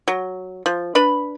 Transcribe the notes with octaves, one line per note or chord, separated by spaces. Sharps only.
F#3
F3
D4 B4 B5